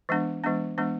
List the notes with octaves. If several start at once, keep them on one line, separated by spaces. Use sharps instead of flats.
E3 G#3 B3 D4
E3 G#3 B3 D4
E3 G#3 B3 D4